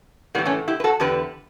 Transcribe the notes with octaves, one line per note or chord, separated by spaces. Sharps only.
A2 E3 G3 B3
A3 C#4
E4 G4
B4
F#4 A4
E2 D3 G4 B4